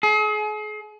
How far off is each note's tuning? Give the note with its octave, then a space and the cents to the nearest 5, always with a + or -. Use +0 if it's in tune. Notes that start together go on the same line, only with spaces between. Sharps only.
G#4 +40